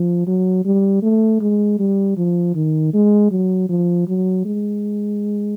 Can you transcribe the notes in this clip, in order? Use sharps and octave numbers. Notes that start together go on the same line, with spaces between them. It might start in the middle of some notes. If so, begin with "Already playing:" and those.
Already playing: F3
F#3
G3
A3
G#3
G3
F3
D#3
G#3
F#3
F3
F#3
G#3